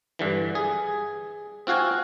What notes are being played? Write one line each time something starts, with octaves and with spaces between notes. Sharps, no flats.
G2 D3 E3
G#4
C4 F4 F#4 F5 G#5